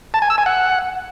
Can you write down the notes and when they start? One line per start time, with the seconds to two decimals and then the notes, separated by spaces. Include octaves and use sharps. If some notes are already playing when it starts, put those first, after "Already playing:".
0.14 A5
0.22 G#5
0.30 E6
0.38 G#5
0.46 F#5